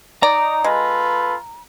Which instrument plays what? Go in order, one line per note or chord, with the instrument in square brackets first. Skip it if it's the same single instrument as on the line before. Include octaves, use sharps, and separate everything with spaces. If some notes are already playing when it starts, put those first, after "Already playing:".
[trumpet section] D#4 [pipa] D5 [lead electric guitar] A#5
[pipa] G#3 [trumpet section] F4 A4 B4